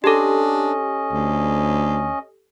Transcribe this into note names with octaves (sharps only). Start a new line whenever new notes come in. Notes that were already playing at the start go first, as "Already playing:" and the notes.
C#4 D4 G4 A4 D#5
D2